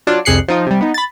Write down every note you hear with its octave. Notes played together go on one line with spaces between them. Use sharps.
F#3 D4 F4
C2 F2 G#4 F#6 C7 C#7
F3 D#4 F4
C3 G3
B3 D#4
B5 A6